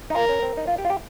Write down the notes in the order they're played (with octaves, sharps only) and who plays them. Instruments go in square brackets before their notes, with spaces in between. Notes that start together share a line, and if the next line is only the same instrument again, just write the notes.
[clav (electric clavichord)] D#4
[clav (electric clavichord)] F4 [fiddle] A#4
[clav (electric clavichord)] C#4
C4
D#4
F4
G4
F4
G4